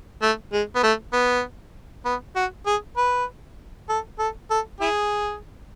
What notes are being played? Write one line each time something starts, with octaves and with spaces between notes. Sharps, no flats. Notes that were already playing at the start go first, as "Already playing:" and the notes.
A3
G#3
B3
A3
B3
B3
F#4
G#4
B4
A4
A4
A4
E4 G#4